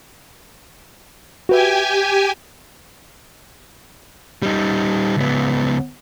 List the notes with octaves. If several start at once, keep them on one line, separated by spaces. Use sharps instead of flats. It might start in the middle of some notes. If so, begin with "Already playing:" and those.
F#4 G4 B4 E5 G5 G#5
G3 D#4
C#2 B3